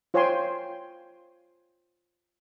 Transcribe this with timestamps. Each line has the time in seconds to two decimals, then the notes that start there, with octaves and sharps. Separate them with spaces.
0.14 F4 C5 C#5 G5 G#5 C6